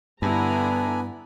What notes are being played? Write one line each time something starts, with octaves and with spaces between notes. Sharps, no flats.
G2 D3 B3 D4 E4 G#5 A#5 B5